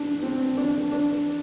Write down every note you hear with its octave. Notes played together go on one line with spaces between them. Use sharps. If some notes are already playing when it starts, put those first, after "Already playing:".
Already playing: D4
C4
D4
D4